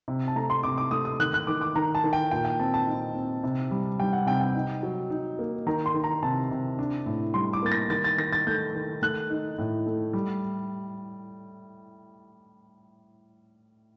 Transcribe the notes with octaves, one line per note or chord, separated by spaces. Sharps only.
C3
A5
A3 A#5
C6
C3 D6
D6
A3 D#6
D#6
D#3 F#6
F#6
D#3 D6
D6
D#3 A#5
A5
D#3
G5
A#2 G5
G5
C4 A5
A5
D#4
C4
C3
G3
G3 G5
F#5
C3 G5
G5
D#4
F#3
D#4
A#3
D#3 A#5
C6
D#3
A#5
C3 A5
C3
D4
A2
G3 C6
D6
A#3 A6
A#6
D#3 A6
A6
D#3 A#6
A6
A3 G6
D#3
A3 F#6
D#4
A2
A3
G3